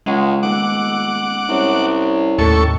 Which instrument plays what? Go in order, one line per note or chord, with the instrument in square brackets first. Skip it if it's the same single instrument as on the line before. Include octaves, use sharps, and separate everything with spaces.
[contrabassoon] C#2 [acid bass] G#3 [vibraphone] F#5
[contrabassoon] D#1 [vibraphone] B3 E6 [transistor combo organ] F#5 D6
[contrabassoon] C2 [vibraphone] C#4 G4 C#5
[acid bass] D#2 [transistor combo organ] A2 A4 C#6